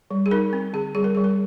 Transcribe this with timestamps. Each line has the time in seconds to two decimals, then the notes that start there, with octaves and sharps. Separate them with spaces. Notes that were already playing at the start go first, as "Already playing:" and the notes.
0.11 G3
0.26 G#4
0.31 D#4 A#4
0.53 C4
0.74 D3 G#4
0.95 G3 G#4
1.04 A#4
1.15 G3 G#4
1.24 A#4